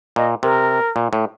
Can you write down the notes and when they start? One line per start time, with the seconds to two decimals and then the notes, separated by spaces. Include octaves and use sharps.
0.16 A#2 D#5
0.43 C3 A#4
0.96 A#2
1.13 A2